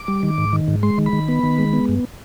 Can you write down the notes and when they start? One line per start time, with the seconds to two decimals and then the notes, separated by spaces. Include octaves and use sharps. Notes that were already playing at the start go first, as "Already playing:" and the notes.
Already playing: D6
0.08 G3
0.23 D#3
0.38 G#2
0.53 D#3
0.68 G#2
0.83 G#3 C6
0.98 D#3
1.06 B5
1.13 D#3
1.28 B3
1.43 D#3
1.59 G#3
1.73 B3
1.89 G2